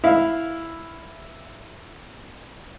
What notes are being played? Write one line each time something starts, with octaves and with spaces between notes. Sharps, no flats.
E4 E5 F5